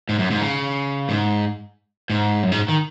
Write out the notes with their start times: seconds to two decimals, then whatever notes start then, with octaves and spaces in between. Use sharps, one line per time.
0.09 G#2
0.19 F#2
0.31 G#2
0.41 C#3
1.09 G#2
2.10 G#2
2.43 F#2
2.52 G#2
2.68 D#3